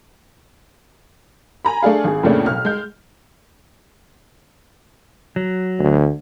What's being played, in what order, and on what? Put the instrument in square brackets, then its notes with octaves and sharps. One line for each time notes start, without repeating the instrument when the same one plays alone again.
[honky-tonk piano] G#5 A#5 B5
A3 D4 G#4 F5
G#1 G#4
F2 A2 C#3 A3 A#3 D4
B1 F6
G#3 G6
[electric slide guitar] F#3
[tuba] D2